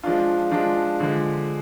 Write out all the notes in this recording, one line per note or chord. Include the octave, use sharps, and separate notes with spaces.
F3 G#3 D4 F4
F3 G#3 D4 F4
D3 F3 G#3